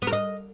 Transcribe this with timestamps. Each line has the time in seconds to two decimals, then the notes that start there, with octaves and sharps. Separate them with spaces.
0.02 B3
0.07 A#4
0.13 D#5